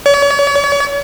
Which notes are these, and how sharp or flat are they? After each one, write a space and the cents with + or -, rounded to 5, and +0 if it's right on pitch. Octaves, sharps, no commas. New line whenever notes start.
C#5 +40